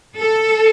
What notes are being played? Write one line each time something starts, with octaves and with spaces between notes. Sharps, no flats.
A4